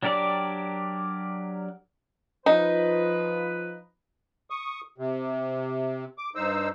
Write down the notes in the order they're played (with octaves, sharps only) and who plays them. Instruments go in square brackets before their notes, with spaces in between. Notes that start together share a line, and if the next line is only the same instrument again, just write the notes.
[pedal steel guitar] F#3 D4 G4 A#4 D5
[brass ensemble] F3 B4 [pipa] D#4
[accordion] C#6 D#6
C3
D6
G2 D#4 C5 E6